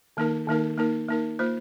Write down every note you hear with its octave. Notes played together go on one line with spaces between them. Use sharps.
D#3 A#3 D#4 A#4
D#3 A#3 D#4 A#4
A#3 D#4 A#4
A#3 D#4 A#4
A#3 F4 C5